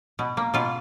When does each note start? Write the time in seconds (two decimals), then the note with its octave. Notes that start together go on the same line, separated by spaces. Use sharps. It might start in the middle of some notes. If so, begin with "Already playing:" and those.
0.19 B2
0.37 A#3
0.54 B2 F4